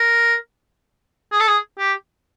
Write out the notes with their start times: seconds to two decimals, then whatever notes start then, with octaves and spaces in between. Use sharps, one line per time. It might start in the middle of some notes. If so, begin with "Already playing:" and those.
Already playing: A#4
1.32 G#4
1.40 A4
1.47 G#4
1.78 G4